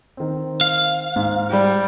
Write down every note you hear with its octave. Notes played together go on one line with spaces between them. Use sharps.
D#3 C4
F5
G#2
G3